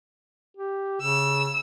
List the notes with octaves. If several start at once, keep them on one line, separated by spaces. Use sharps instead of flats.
G4
C#3 E6